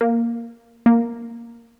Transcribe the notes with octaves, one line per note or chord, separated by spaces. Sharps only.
A#3
A#3